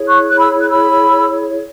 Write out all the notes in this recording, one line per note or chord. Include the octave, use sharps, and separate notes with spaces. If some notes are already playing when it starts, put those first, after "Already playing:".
Already playing: E4 G#4 C#5
C#6 F#6
F#6
B5 E6
F#6
B5 E6